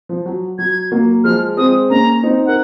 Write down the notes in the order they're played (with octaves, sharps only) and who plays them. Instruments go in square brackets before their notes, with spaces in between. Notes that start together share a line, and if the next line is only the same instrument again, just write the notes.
[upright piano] F3
F#3
[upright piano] F#3 [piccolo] G#6
[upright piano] F#3 A#3
[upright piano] F3 G#3 [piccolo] F6
[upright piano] G#3 C4 [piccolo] D#6
[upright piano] A#3 C#4 [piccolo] A#5
[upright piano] C4 D#4
[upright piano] A#4 [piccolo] F#5